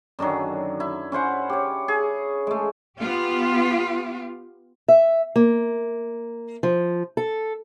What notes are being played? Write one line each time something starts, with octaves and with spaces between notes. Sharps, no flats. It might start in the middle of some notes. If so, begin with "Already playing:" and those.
F#2 D3 D#3 F#3
E4
C#4 E4 C5 F#5
G4 C#5
G#4
G#3 A3
B3 F4 G4
E5
A#3
F3
A4